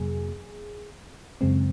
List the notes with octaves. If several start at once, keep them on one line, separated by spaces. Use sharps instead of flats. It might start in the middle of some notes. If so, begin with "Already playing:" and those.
Already playing: F2 C3 F#3 A#3 G#4
F#2 C#3 G#3 C4